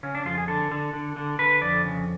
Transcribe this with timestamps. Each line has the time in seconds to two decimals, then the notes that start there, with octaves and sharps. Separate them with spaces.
0.03 C#3 C#4
0.15 D4
0.25 F2 F4
0.38 G#4
0.48 D3 A4
0.72 D3
0.93 D3
1.16 D3
1.39 D3 B4
1.61 F2 D5
1.85 C#3